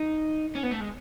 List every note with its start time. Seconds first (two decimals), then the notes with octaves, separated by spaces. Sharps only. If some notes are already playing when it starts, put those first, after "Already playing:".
Already playing: D#4
0.55 C#4
0.63 B3
0.71 A3
0.80 G#3